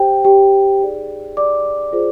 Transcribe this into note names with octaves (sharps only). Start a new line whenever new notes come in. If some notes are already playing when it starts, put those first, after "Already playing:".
Already playing: G4 C5 G5
G4 G5
D#4 G#4 D5
D5 D6
F4 G#4 C5